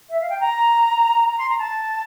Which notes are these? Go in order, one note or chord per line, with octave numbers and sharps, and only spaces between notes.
E5
F5
G5
A#5
A#5
C6
A#5
A5